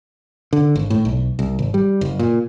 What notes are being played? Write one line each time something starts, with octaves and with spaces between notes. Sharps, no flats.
D3
G#1
A2
B1
C2
G#1
G3
F#1
A#2